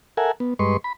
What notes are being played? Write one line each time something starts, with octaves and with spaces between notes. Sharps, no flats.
A4 A#4 E5 F#5 G#5
B3
G2 G#3 B4 D#5 C6 C#6
B5